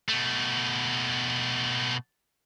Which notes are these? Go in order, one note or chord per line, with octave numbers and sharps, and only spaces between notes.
B2 A3